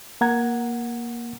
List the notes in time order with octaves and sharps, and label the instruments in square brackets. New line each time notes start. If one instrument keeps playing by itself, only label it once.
[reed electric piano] A#3 F#5 A#5 G#6